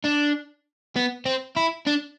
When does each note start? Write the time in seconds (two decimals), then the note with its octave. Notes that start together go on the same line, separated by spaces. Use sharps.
0.04 D4
0.96 B3
1.25 C4
1.57 E4
1.87 D4